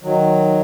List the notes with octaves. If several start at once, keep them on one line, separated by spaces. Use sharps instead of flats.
D#3 F#3